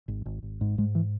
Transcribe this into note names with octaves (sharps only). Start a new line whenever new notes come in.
G#1
G#1
G#1
G#2
G#2 G#3
E3